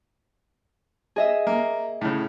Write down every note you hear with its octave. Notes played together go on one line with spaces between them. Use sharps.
G#4 D#5 E5
A#3
A2 C#3